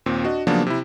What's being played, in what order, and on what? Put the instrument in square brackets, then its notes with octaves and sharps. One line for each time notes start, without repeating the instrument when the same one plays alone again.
[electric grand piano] D#2 A#2 C4
D4 F#4 D#5
C#3 F3 F#3 A#3 B3 D4
C3 E4